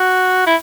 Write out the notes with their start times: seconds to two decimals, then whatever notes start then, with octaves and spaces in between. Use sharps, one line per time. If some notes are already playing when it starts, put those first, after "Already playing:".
Already playing: F#4
0.47 E4